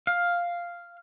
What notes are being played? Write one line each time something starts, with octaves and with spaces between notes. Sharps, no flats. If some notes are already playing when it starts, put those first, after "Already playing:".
F5